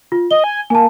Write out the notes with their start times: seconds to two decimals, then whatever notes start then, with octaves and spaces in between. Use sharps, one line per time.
0.12 F4
0.31 D#5 G7
0.44 G#5
0.70 A#3 G#5 A5